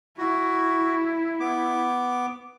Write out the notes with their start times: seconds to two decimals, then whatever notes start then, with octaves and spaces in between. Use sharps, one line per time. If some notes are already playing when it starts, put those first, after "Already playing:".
0.18 E4 F#4
1.40 B3 D6